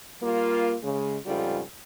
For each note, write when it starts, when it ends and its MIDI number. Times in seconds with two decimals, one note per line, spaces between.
0.22 0.75 55
0.22 0.75 58
0.22 0.75 65
0.83 1.17 49
0.83 1.17 56
1.26 1.62 41
1.26 1.62 44
1.26 1.62 49
1.26 1.62 55
1.26 1.62 65
1.26 1.62 69